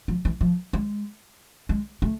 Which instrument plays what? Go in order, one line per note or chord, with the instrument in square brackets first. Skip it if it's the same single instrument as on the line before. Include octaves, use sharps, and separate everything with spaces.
[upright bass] F3
E3
F3
G#3
G#3
A3